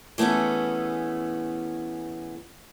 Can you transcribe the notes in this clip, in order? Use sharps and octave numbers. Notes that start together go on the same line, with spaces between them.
E3 A3 B3 C#4 G#4